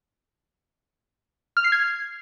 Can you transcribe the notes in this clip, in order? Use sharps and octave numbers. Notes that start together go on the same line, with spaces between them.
F6
C7
G#6